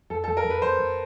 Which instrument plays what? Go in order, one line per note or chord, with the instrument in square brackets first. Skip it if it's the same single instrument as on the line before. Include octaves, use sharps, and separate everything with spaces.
[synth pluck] F2 [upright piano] A4
[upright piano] A4
[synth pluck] F2
[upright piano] A#4
[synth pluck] F2
[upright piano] B4
[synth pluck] F2 [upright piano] C5
[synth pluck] F2